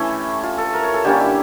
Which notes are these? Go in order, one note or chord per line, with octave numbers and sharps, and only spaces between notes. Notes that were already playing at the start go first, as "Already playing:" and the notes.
Already playing: E3 A3 C#4 E4 G4
F4
A4
A#4
C#5
A4
D3 G3 A#3 C#4 G4
E4